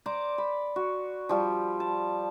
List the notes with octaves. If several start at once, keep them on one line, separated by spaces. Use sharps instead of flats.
C5 D5 A#5 D6
B5
F#4
F3 G3 F4
A5